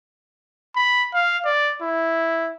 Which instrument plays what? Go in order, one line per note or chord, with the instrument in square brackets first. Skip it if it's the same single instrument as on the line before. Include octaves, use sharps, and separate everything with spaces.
[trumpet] B5
F5
D5
E4